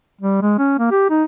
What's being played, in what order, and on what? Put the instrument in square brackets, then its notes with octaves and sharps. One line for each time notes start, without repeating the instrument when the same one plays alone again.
[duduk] G3
G#3
C#4
A#3
G4
D#4